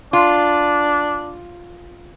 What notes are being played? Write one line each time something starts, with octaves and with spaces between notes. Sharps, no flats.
D4 F4